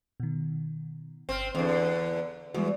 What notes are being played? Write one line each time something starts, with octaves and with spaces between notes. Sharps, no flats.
B2 D#3
G1 C4 F6
E2 D3 C4
E2 G3 G#3 F#4